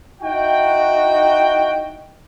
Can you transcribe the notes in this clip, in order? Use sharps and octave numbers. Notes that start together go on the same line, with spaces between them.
D#4 E4 F#4 G5